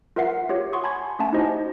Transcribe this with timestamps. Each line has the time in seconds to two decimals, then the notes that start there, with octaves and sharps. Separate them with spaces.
0.16 F4 A#4 B4 E5 F#5 C7
0.49 F4 G4 C#5
0.72 F#5 C6 C#6 D#6
0.84 G#5 A5 B5 C6 G#6
1.19 A3 C#4 E5 F#5 G#5 A5
1.33 D#4 E4 F#4 G4 C5 D#5